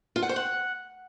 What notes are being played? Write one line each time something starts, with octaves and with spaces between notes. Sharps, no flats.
F4
F#5
C5
F#5